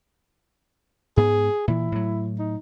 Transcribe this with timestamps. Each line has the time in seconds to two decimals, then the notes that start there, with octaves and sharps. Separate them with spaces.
1.17 G#2 B3 G#4
1.68 A#2 E3 E4
1.92 A2 F#3
2.39 D#4